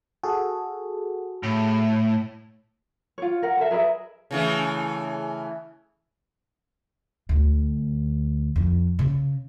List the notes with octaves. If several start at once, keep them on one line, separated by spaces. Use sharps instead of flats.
F#4 G#4 A4
A2
F4 C#5
A#4 F#5
A4 A#4 E5
G#4 A#4 B4 E5
C#3 E3 A3
D2
F2
C#3